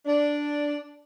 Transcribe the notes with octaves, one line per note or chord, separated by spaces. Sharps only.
D4